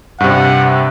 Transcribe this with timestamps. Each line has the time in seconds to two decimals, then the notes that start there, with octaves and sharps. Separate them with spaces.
0.20 G2 C3 F#5